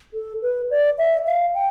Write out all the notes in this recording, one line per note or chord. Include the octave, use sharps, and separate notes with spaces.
A4
B4
D5
E5
F5
G5